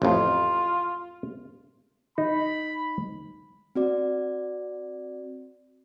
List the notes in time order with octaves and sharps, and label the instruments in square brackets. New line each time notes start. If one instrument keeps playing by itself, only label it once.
[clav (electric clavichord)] A1 F2 [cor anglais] F4
[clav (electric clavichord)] D#4 [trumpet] B5
[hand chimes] C4 F#4 D5